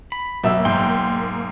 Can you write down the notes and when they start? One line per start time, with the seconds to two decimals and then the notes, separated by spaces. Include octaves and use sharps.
0.12 B5
0.43 B1 A#3 E5 E6
0.65 G#2 G5 C6